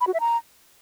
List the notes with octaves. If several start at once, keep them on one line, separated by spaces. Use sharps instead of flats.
B5
F#4
E5
A#5